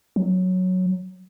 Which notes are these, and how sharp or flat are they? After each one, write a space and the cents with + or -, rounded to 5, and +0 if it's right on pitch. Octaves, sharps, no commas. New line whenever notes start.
F#3 -5